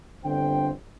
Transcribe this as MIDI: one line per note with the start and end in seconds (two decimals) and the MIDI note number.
0.25 0.71 31
0.25 0.71 50
0.25 0.71 60
0.25 0.71 79